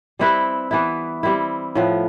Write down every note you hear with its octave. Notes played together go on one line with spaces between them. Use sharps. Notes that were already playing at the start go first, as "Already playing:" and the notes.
G3 C4 E4 B4
E3 B3 E4
G3 C4 E4
A2 F3 B3